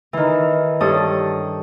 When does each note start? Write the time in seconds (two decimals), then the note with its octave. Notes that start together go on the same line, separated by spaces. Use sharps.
0.13 D#3 E3
0.80 G2 A4 C#5 D#6